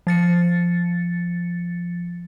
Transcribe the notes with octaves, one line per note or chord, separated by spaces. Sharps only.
F3 A6 C#7